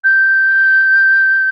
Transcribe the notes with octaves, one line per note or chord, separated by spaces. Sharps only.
G6